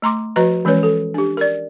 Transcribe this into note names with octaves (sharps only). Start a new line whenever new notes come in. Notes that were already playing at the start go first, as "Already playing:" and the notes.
A3 A#5 C6 D6
F3 F#4 B4 D#5 A#5
E3 G#3 C#4 B4 C#5
A4
D4 G4
A#4 D5